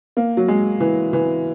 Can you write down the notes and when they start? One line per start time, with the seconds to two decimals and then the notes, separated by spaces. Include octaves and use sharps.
0.17 A#3
0.37 F#3
0.48 G#3
0.80 E3
1.13 E3